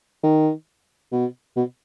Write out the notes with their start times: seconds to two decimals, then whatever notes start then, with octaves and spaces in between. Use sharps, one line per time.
0.23 D#3
1.12 B2
1.57 B2